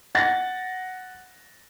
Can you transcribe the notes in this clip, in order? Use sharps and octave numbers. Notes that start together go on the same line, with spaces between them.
F#5 A6 A#6